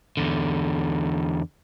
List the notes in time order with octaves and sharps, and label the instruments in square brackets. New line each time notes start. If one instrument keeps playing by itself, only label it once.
[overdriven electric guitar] E2 D3